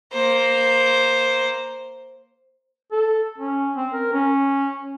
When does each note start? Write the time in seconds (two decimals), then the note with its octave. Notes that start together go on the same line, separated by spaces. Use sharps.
0.13 A#3 C5
2.92 A4
3.38 C#4
3.76 C4
3.93 A#4
4.13 C#4